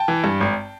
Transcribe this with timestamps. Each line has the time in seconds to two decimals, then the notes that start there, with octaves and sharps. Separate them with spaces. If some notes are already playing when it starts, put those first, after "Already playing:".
Already playing: G5 A5
0.08 E3
0.24 G2
0.41 G#1